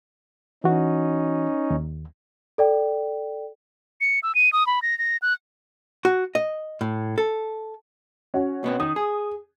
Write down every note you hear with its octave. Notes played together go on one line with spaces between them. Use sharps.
E3 C#4 D#4 F#4
D#2
A4 D5 G5
C#7
E6
D#7
D#6
B5
A#6
A#6
F#6
F#4
D#5
A2
A4
C#4 F#4
B2 B3 C4
D#3 D#6
G#4